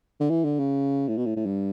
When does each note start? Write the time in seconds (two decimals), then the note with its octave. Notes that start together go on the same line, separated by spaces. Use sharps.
0.20 D3
0.30 E3
0.44 D3
0.59 C#3
1.08 A2
1.17 B2
1.26 A2
1.36 A2
1.46 G2